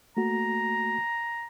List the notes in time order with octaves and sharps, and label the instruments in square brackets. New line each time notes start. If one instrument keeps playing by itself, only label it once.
[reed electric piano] A3 A#3 F#4 [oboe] A#5